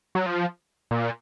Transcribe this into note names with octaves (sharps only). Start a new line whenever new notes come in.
F#3
F3
A#2